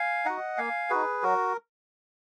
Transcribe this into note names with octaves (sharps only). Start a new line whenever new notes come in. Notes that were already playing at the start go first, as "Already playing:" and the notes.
Already playing: F5 G#5
D#4 F#4 D#5 F#5
A#3 F5 G#5
D#4 F#4 G#4 B4
F#3 F#4 A#4